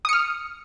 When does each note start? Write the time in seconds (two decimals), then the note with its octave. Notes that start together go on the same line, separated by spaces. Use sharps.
0.05 D#6
0.09 C#7
0.13 F6